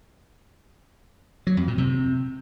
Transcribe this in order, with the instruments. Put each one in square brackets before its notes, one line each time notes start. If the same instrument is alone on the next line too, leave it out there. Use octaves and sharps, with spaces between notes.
[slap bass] F#3
F2
A#2
C3